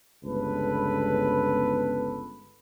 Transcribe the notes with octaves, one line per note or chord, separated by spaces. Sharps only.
G1 C#2 A4 B4